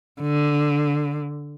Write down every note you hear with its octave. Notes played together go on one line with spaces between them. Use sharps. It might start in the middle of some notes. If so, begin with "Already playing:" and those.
D3